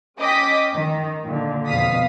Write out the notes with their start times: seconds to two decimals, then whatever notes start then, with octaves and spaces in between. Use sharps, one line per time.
0.19 C#4 D#5 G5 D6 D#6 B6
0.73 D#3
1.25 A#2 D3
1.67 F2 B2 F5 D#6 B6